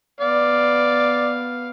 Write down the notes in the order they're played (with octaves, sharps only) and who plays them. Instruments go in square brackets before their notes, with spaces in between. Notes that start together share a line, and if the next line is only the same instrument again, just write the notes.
[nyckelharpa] B3 F5 [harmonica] D5